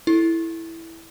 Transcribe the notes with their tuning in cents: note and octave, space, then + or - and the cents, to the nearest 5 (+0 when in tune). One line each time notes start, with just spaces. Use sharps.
E4 +0 A4 +0